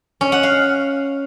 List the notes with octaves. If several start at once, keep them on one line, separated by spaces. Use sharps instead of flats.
C#4
F#5
F5